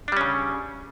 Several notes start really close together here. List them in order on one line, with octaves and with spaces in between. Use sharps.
D4 G3 C#4 C#3